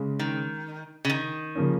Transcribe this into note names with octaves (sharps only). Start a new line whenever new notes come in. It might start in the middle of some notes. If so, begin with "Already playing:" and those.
Already playing: C#3 G#3 C#4
D#3
C#3
D#3
C#3 F3 A#3 C#4